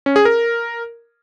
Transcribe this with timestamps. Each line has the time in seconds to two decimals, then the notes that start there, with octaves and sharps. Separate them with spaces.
0.06 C#4
0.16 G#4
0.25 A#4